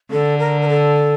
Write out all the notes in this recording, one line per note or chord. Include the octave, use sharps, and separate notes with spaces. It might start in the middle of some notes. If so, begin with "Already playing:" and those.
D3 A4
A#4
A#4
A4